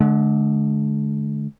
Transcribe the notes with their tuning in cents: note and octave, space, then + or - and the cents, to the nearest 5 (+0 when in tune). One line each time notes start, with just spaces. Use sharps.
D3 +0 G#3 +45